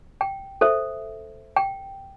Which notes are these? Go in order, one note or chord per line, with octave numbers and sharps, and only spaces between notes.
G5
A4 C5 E5
G5